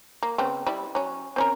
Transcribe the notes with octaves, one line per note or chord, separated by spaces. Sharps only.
A#3
C#3 B3 C4
G3 E4
F#3 C#4
C4 C#4 A#4